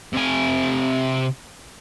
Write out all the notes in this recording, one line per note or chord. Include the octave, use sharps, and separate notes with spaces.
C3 G#5